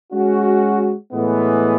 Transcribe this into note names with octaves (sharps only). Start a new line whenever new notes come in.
G#3 C#4 F#4
A2 E3 G#3 B3